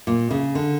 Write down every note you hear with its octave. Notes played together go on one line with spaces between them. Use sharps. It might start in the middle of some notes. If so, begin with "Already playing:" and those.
A#2
C#3
D3